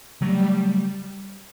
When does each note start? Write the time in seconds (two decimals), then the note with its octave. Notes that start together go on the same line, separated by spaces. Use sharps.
0.21 C#3 F#3 G3 A3